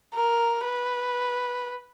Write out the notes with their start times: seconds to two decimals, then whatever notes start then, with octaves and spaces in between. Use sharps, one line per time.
0.14 A#4
0.65 B4